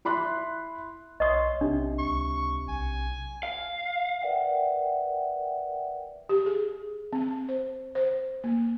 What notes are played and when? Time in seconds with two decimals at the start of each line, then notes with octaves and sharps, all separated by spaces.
0.05 E4 B5 C6 F#6
1.20 B1 C#5 D#5 C6 D#6
1.61 B1 C3 D4
1.99 C#2 C#6
2.69 B1 G#5
3.43 F5
4.22 A#4 B4 D5 E5 F#5 G5
6.29 G4
6.46 G#4
7.13 C4
7.49 C5
7.95 C5
8.44 A#3